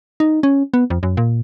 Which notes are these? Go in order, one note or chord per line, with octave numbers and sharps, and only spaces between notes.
D#4
C#4
B3
F2
F#2
A#2